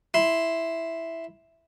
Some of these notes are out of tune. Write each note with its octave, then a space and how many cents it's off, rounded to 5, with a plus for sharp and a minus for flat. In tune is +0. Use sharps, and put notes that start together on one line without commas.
E4 +0 C6 +0